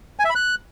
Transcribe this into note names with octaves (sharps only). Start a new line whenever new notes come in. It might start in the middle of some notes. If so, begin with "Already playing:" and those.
G#5
E5
B5
F#6